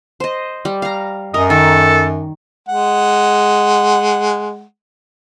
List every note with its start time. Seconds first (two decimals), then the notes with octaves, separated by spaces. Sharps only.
0.20 C5 D#5
0.65 G3
0.82 F5 A#5
1.34 F#2 A#4 D#5
1.50 D#3 A4
2.68 G#3 F#5